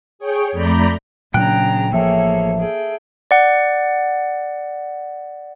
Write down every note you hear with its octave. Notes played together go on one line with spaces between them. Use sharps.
G#4 C#5 G5
F2 A3 D5 A#5 B5 G6
A#2 C#3 F#3 D4 G5 A#5 F#6
A1 F3 A#3 G#4 A4 C#5 E5
G#4 G5
D5 F#5